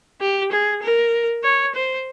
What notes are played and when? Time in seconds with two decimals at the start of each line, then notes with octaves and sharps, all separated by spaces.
0.21 G4
0.51 G#4
0.82 A#4
1.44 C#5
1.74 C5